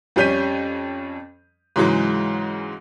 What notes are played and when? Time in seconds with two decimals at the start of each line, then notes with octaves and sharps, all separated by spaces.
0.16 F2 G3 C#4 G6 B6 D#7
1.76 G#2 C#3 E3 F#3 G#3